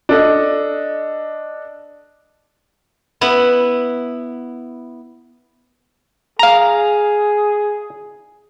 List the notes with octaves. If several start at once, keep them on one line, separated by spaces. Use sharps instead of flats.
D4 A4 D#5
B3 E4
G#4 F5 A#5